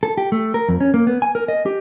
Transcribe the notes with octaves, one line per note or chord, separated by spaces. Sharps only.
A4
G4
A3
A#4
F2
C#4
A#3
B3
G#5
A#4
D#5
G4